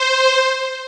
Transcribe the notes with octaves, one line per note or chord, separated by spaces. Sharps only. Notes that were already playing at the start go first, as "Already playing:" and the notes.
Already playing: C5